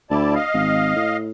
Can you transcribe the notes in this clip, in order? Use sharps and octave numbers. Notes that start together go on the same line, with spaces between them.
D2 E4 D5 A5
D#5 F5
G#1
A2